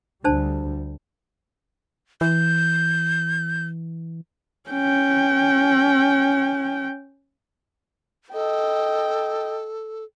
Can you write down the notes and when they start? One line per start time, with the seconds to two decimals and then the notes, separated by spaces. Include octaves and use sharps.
0.24 D2 G3 D4 C5 A5
2.21 E3 G6
4.70 C#4 G5
8.34 A4 D#5 G5